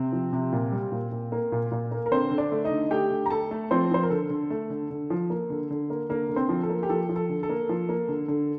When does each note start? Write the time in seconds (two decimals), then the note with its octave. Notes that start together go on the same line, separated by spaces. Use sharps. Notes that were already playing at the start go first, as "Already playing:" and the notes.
Already playing: C3 C4
0.12 F3
0.33 C3
0.52 A#2
0.72 G3
0.92 A#2
1.12 A#2
1.32 A#3
1.52 A#2
1.72 A#2
1.91 A#3
2.06 A#4
2.12 D3 C4 C5
2.31 D3
2.38 D4 D5
2.52 A3
2.64 D#4 D#5
2.71 D3
2.91 A3 G4 G5
3.11 D3
3.26 A#5
3.30 A3 A4 A5
3.51 A3
3.71 F3 C4 C5
3.91 F3 C5
4.03 A#4
4.10 D3 A4
4.30 D3
4.50 A3
4.70 D3
4.90 D3
5.10 F3
5.30 A#3
5.50 D3
5.70 D3
5.90 A#3
6.09 D3 A#3 A#4
6.29 D3
6.36 C4 C5
6.49 F3
6.63 A4
6.69 A#3
6.83 G4
6.90 F3 A4
7.09 F3
7.16 A4
7.29 D3
7.43 A4
7.49 A#3
7.69 F3
7.89 A#3
8.09 D3
8.28 D3